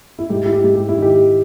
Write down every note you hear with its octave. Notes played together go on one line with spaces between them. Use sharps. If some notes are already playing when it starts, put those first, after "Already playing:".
E4
G#2 G4
E4
G4
G#2
G4
E4
D#3 G4